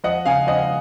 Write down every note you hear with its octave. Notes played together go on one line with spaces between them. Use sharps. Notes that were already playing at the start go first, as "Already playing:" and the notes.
F3 D#5 F#5
C#3 F5 G#5
F3 D#5 F#5